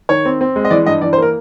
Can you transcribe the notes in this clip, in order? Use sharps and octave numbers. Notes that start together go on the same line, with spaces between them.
D#3 C#5
C4
C4
G#3
D#5
E3 D5
G2 D#5
E3 D5
C5
A#3 A#4